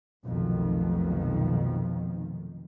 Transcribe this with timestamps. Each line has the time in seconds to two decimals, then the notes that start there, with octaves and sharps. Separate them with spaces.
0.24 F1 B1 F2 D#3